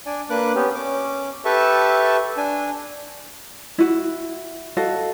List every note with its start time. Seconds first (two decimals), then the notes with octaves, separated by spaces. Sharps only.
0.06 D4 D5 G#5
0.30 A#3 D4 B4 D6 F#6
0.55 B3 C#4 G4
0.75 C#4 D6
1.45 G4 A4 B4 E5 A5 C#6
2.37 D4 G#5
3.78 E4 F#4
4.77 F#4 A4 D#5 F5